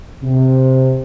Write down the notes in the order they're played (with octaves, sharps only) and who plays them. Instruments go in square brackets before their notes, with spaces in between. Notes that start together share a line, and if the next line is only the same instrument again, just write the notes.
[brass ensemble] C3